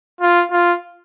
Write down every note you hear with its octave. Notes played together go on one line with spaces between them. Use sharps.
F4
F4